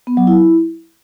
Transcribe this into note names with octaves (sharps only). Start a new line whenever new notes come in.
B3
F#3
E4